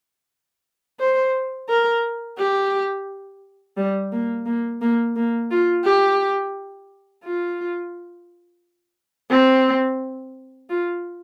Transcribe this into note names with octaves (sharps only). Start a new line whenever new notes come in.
C5
A#4
G4
G3
A#3
A#3
A#3
A#3
F4
G4
F4
C4
F4